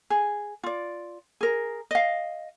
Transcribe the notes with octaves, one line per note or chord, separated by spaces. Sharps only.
G#4
F4 D5
G#4 A#4
D#5 F5